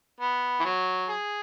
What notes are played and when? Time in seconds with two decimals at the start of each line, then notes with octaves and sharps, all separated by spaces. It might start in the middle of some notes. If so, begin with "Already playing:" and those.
0.21 B3
0.60 E3
0.65 F#3
1.08 G#4